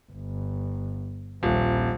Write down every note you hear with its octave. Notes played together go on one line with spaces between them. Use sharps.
G1
D#1 A#1